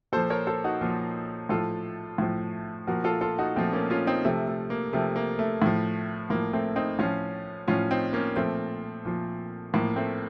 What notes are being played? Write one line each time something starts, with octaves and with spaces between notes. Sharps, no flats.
A#2 F3 A4 C5
A#4 C#5
A4 C5
D#4 F#4
A#2 F3
A2 F3 F4 A4
A2 F3
A#2 F3 F#4 A#4
F4 A4
F4 A4
D#4 F#4
A#2 F3 A3 C4
A#3 C#4
C#4 F4
C4 D#4
C3 F3 A3
A3
A#3
C3 F3 A3
A#3
A3
A2 F3
A2 F3 A#3
A3 C4
C4 D#4
A2 F3 C#4 F4
A2 F3 C#4 F4
C4 D#4
A#3 C#4
A#2 F3 A3 C4
A#2 F3
A2 F3 A#3
A3 C4